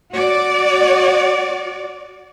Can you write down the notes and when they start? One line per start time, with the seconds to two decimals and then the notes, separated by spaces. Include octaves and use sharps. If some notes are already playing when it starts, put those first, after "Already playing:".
0.14 F#4 D5